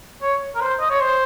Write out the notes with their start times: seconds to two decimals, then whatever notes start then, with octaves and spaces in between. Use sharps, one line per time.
0.22 C#5
0.55 A#4
0.61 C5
0.80 D#5
0.89 C#5
1.00 C5